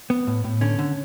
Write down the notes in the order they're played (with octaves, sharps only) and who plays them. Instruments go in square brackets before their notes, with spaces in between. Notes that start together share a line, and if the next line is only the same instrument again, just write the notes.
[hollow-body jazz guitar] B3
A2
A2
D3 C#4
D3